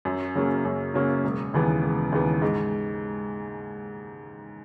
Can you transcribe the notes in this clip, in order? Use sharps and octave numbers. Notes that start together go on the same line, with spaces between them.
F#2
C#3 F#3 A#3 C#4
F#2
C#3 F#3 A#3 C#4
E1
D#2 C#3 E3 B3
E1
D#2 C#3 E3 B3
G#2